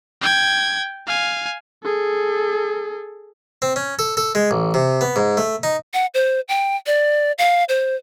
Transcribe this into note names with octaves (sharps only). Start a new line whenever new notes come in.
G5 G#6
F5 G#5
G#4 A4
C4
C#4
A4
A4
G#3
A1
C3
B3
G#2
A3
D#4
F#5
C5
G5
D5
F5
C5